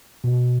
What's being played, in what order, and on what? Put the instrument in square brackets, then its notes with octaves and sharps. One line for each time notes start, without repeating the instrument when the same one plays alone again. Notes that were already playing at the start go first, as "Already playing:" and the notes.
[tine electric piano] B2